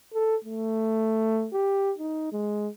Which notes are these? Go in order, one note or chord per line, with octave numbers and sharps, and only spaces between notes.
A4
A3
G4
D#4
G#3